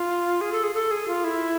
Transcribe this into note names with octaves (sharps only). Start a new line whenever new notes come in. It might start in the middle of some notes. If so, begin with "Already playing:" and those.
Already playing: F4
G#4
A4
G#4
A4
G#4
F4
E4